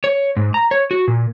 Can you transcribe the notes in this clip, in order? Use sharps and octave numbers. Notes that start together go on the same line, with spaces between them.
C#5
G#2
A#5
C#5
F#4
A#2